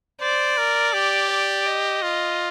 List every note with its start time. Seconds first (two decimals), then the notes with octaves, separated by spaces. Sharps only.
0.21 C5 D5
0.58 A#4
0.93 G4
1.30 D5
1.66 D#5
2.02 F4